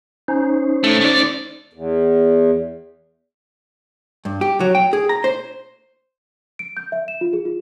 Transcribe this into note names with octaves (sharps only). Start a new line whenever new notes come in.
C#4 D#4 C5
A2 A3
A3 D5
E2
G2
G4
F#3
G5
G#4
A#5
C5
D7
G6
E5
E7
F4
G#4
F4